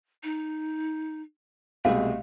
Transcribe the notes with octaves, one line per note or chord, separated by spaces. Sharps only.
D#4
C2 B2 G#3 A3 F5